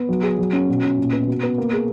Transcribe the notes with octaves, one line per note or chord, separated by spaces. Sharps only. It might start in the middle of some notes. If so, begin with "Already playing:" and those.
Already playing: B3
F#3
G#4
F#3
C#4
B2
C#4
A#2
B3
B2
B3
A#3
G#4